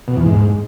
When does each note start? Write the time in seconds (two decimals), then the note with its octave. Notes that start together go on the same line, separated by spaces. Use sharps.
0.08 B2
0.17 E2
0.26 G#2